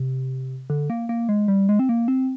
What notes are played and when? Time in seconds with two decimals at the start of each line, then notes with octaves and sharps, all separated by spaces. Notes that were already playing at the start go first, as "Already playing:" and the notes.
Already playing: C3
0.70 D3
0.90 A#3
1.09 A#3
1.29 G#3
1.48 G3
1.69 G#3
1.79 C4
1.89 A#3
2.08 C4